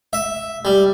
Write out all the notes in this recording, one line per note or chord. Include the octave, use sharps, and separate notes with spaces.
E5
G3